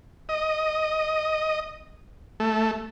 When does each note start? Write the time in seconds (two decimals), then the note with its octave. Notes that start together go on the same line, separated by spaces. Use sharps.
0.29 D#5
2.40 A3